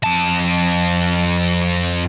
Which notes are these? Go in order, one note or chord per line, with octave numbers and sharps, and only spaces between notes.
F2 A5